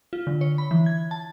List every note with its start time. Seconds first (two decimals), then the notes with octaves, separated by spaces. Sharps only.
0.13 F4
0.27 D3
0.41 C#5
0.58 B5
0.71 E3
0.86 G#6
1.11 A5